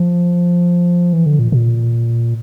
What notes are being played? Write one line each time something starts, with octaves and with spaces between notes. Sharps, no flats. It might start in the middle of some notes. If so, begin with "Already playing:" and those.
Already playing: F3
E3
D3
A#2
A#2